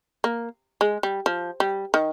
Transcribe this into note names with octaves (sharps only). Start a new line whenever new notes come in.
A#3
G#3
G3
F3
G3
D#3